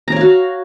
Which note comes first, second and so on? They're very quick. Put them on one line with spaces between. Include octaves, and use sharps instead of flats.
A#5 C#5 F5 F#4